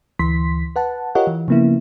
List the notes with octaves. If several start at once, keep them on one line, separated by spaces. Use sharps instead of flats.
D2 E3 C6 B6
B4 F#5 A5
F4 G4 A#4 C#5 D#5 F#5
E3
C#3 F3 A#3 B3 E4